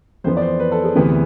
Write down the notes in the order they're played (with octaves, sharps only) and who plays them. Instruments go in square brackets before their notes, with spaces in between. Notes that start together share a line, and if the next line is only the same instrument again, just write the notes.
[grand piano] F2 E3 B3 C5
D5
C5
B4
A4
G#4
D2 C3 E3 B3